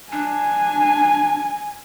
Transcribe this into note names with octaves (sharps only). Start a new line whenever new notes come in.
D4 G#5